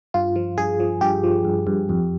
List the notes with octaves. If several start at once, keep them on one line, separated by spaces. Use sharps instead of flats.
G2 F4
F3
G2 G#4
F3
G2 G4
F3
G2
G2
F2